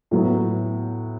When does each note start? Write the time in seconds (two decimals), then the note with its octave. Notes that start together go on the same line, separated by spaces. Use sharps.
0.11 A2 F#3 B3